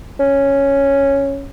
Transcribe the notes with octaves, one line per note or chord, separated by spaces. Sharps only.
C#4